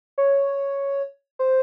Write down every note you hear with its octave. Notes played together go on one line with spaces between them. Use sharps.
C#5
C5